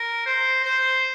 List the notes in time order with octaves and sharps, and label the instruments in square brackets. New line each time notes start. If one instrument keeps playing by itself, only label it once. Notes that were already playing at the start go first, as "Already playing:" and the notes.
Already playing: [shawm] A#4
C5
C5